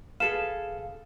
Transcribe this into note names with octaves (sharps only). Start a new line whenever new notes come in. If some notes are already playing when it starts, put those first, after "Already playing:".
G#4 A4 B4 F5 E7